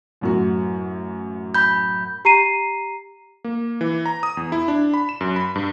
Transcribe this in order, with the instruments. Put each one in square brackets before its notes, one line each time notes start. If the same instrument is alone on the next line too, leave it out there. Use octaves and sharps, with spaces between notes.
[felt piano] A1 F#2 F#4
[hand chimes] B5 G6
[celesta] G4 A#5 C7 D#7
[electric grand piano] A#3
E3
A#5
D#6
E2
E4
D4
B5
E7
F#2
B5
G2